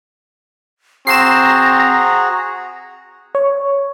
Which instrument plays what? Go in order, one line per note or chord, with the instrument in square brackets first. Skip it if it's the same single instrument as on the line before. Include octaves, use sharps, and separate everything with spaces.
[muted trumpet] C4 [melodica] F#4 G#4 [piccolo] A#5 [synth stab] C7 E7
[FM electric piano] C#5